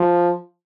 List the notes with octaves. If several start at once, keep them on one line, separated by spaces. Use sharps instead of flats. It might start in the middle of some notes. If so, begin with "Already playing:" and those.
Already playing: F3